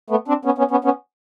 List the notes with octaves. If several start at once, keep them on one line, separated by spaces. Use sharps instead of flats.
A3 B3
C4 D4
B3 C#4
B3 C#4
B3 C#4
B3 C#4